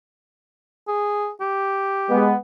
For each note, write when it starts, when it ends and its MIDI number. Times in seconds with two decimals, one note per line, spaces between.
0.88 1.30 68
1.41 2.25 67
2.09 2.35 56
2.09 2.35 59